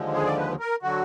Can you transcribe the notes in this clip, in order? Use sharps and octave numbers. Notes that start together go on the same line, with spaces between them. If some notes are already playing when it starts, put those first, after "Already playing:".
Already playing: D#2 D3 F3 G#3
G#4
D5
B4
A#4
D3 F#3 F#4